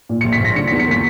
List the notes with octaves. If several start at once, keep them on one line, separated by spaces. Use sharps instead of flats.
A#2
A#1 C#7
B6
A#1 A#6
D3 C#7
E2 B6
C#7
A#3 B6